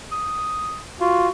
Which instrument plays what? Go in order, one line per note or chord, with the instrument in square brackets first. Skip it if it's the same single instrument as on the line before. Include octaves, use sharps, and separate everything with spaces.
[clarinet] D#6
[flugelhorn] F4 [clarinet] F#4